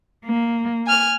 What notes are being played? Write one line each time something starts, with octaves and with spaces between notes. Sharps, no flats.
A#3
G#5 F6